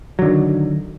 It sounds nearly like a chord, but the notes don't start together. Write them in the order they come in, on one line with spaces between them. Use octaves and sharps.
F#3 D3 D#3